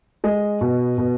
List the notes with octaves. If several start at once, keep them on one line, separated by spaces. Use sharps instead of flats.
G#3 D#5
B2
B2